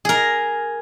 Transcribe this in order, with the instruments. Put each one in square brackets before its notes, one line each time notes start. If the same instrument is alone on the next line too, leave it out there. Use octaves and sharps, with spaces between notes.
[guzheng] G#4 A#4